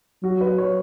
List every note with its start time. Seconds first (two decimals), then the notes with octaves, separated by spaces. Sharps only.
0.23 F#3 F#4
0.41 B4
0.58 C#5